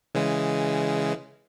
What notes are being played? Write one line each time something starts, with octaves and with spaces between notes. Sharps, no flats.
C#3 E3 G#3